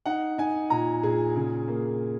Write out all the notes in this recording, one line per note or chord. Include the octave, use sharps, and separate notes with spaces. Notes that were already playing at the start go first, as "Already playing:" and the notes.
D#4 F#5
D#4 G#5
A#2 A#5
A#2 G#4
C#3
A#3